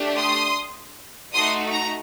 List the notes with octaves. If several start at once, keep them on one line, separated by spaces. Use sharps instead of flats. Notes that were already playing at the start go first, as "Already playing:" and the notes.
Already playing: A3 D4 G4
C6 D#6
A3 D#4 F#4 C6 D#6
A#5